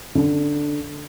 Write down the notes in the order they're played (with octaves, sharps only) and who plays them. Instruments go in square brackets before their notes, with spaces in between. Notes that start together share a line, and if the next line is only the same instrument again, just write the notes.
[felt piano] D3